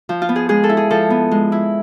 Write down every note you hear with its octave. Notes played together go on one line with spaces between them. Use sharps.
F3
F4
B3
G#4
G#3 G#4
A4
E4
G#4
F3 A4
B3
G#3
E4